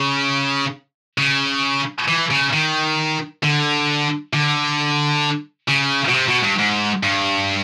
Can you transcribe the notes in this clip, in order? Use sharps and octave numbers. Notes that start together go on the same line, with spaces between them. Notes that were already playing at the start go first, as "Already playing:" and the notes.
Already playing: C#3
C#3
E3
C#3
D#3
D3
D3
C#3
B2
C3
B2
G2
G#2
G2